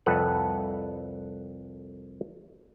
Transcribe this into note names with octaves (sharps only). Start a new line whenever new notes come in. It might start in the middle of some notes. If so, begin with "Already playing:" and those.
C2 F2 A4 B4 F#5